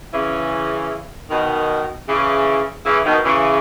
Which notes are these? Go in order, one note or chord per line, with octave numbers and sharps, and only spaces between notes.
C#3 E3
B2 D#3
C#3 E3
C#3 E3
B2 D#3
C#3 E3